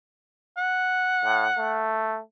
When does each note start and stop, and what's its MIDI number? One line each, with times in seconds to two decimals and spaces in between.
0.57 1.88 78
1.24 1.45 45
1.58 2.19 57